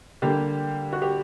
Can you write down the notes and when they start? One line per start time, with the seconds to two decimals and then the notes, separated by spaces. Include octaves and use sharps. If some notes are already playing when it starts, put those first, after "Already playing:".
0.22 D3 G3 A#3 G4
0.93 F#4
1.02 G4